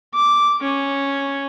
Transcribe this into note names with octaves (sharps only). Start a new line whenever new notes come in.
D6
C#4